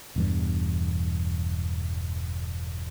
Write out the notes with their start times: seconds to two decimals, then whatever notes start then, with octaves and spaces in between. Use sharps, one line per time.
0.16 E1 E2 G2